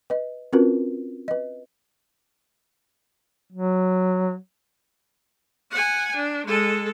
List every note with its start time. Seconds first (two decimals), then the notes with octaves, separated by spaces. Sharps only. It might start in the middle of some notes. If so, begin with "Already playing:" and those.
0.10 B4 D#5
0.53 C4 C#4 F4 F#4 A#4 B4
1.28 B4 D#5
3.53 F#3
5.71 F#5 G#5
6.16 D4
6.46 G#3 A4